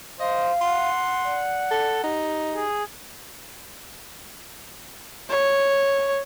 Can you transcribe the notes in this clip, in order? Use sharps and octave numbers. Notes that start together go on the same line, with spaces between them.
C5 D#5 F5
F#5 C6
D5
A4
D#4 G4
G#4
C#5